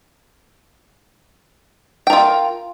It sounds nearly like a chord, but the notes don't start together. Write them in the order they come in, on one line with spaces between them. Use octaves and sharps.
G5 A#4 F4